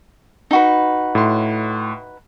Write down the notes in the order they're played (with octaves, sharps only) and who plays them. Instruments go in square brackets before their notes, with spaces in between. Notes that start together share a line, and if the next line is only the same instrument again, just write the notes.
[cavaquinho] D#4 F#4 B4
[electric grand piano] A2 C6